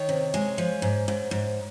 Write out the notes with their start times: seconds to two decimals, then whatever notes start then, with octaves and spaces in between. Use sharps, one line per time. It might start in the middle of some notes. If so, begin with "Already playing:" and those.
Already playing: D#3 C#5
0.09 C3
0.34 G#3
0.58 F3
0.82 G#2
1.08 G#2
1.31 G#2